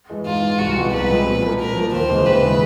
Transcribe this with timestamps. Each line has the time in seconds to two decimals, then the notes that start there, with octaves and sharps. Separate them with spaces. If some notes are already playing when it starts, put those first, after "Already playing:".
0.10 E3 G#3
0.26 G#2 F4
0.42 E3 G#3
0.59 C2 F#4
0.76 C3 F3 G#3 B3
0.93 C2 B4
1.10 C3 F3 G#3 B3
1.26 A#2
1.43 F3 A#3
1.59 A#2 A#4
1.76 F3 A#3
1.92 D#2 C5
2.10 C#3 E3 G#3
2.26 D#2 B4
2.42 C#3 E3 G#3